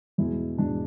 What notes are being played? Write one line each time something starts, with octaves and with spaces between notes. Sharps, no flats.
E2 B2 G#3 E4
E2 B2 G#3 D4